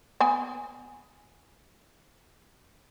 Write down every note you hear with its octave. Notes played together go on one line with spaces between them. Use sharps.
B3 G#5